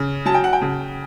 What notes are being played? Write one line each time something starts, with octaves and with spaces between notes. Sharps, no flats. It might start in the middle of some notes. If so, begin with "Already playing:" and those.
Already playing: C#3
F#3 A5
G5
F#5
G5
C#3